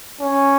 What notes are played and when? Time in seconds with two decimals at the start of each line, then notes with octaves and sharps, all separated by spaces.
0.21 C#4